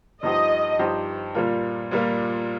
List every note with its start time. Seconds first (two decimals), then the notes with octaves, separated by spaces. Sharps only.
0.22 G2 F3 D#4 G4 C5 D#5
0.79 G2 F3 D#4 G4 C5
1.35 A#2 G3 A#3 F4
1.91 A#2 G3 A#3 F4